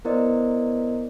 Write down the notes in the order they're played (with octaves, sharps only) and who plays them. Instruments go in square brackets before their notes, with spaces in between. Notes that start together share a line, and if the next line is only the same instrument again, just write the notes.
[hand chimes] B3 E4 A#4 C5 D5 D#5